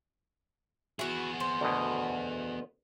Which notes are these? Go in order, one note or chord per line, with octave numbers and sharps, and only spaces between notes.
B3 E4 F#4 G#4
C5
D2 B2